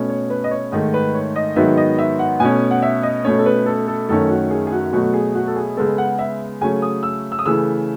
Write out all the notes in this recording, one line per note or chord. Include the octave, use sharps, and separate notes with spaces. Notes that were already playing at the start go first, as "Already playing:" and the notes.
Already playing: B2 A3 C#4
C#5
B4
D#5
C#5
G#2 D#3 A3 D#5
B4
C#5
D#5
G#2 D#3 F#3 B3 E5
D#5
E5
F#5
B2 A3 C#4 G#5
F#5
E5
D#5
B2 A3 C#4 C#5
A4
B4
A4
A4
F#2 D#3 A3 C#4 A4
F#4
G#4
G#4
F#4
B2 F#3 A3 F#4
G#4
F#4
A4
G#4
C#3 G#3 B3 A4
F#5
E5
C#3 F#3 A3 C#4 G#5
D#6
E6
E6
D#6
C#3 E3 A3 E6